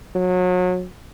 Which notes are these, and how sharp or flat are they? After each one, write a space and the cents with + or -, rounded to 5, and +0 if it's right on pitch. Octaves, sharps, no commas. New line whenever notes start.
F#3 -30